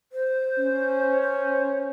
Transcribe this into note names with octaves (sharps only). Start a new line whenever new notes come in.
C5
C#4
C5